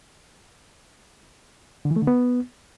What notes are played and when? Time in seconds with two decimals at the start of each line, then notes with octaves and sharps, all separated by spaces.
1.85 D3
1.91 E3
1.96 A3
2.02 D3
2.07 B3